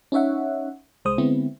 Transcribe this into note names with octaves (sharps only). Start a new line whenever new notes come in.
C#4 D#4 C#5 E5 F#5
C2 G#3 C5 D#6
D3 G#3 B3 C4 E4